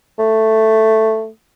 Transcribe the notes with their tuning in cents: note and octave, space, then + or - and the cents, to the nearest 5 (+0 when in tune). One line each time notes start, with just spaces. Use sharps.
A3 +5